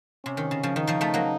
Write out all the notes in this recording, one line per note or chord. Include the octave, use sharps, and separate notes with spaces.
C3 C#4
D#3
C#3
C#3 F3
D#3 D#4
C#3 F3
F3 A3
F#3 A#3